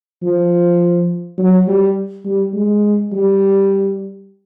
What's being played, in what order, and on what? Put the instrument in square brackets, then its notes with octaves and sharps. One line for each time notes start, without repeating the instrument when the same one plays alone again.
[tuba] F3
F#3
G3
G3
G#3
G3